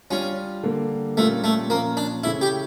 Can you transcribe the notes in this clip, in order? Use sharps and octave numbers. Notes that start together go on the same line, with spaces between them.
G3 C#4 D4 F4
D3 G3 A#3
A#2 G3 A3 C#4 F4 A#4
A3
A#2 F3 A#3 C#4 F4
D4
C#3 E3 A3 C#4 E4
G4